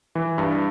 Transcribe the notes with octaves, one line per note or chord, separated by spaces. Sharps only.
E3
G2